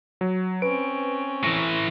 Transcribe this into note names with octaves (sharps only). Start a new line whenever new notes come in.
F#3
C4 C#4 B4 D7
A2 E3 A#6